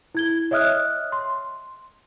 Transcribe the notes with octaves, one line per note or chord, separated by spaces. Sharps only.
E4 G#6 G7
C#5 D#5 E5 D#6 F6 F#6
C6